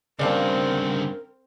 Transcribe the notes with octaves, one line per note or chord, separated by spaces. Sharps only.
G2 C#3 C4 A#4 D5 F5 A5